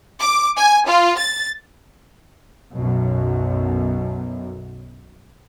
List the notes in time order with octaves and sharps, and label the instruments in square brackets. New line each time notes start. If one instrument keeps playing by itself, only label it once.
[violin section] D6
G#5
F4
A6
[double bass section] B1 F#2 B2